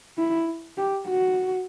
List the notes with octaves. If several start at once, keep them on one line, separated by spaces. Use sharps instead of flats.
E4
G4
F#4